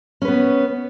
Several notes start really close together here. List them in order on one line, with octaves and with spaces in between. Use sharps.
C#4 B4 B3